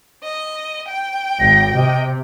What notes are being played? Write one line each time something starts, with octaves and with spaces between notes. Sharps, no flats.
D#5
G5
G#1 A#6
C3 D#5